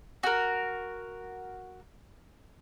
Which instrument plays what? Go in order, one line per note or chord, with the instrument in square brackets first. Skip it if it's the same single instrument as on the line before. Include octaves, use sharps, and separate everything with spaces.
[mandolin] F#4 A#4